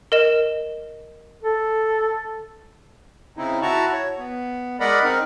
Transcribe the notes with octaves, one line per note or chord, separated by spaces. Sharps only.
A#4 D#5 E7
A4
C#3 C4 D#4 E4
E4 F#4 A5 A#5 C#6
C#5
B3
G#3 A#4 D5 D#5 F#5 B5
C4 D#4 A#4